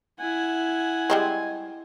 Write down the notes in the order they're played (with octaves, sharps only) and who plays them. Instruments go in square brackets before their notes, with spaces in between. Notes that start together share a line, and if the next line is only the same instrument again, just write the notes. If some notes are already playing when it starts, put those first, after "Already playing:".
[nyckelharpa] E4 F#5 [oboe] G#5
[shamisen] G3 G#3 C4